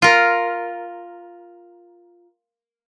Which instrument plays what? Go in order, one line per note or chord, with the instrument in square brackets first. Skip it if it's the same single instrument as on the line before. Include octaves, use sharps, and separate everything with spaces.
[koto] F4 A#4